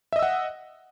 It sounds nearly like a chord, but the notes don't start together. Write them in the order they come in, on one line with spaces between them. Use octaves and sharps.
E5 D#5 E6 F#5